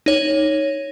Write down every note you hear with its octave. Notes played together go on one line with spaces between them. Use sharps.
D#4 C#5